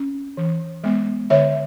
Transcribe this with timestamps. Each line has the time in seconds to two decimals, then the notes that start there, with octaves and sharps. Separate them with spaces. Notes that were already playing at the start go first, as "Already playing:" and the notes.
Already playing: C#4
0.37 E3
0.84 G#3 B3
1.30 D3 C#5 E5